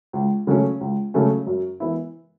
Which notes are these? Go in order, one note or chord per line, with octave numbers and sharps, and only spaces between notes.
C#2
C#3 F#3 A3 C#4
C#2
C#3 F#3 A3 C#4
F#2
E3 B3 E4